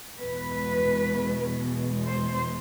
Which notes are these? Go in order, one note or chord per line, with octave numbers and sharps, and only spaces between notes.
E2 B2 G#3 B4
C5